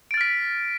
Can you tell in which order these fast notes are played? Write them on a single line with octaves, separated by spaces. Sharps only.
D7 A6 F6 B6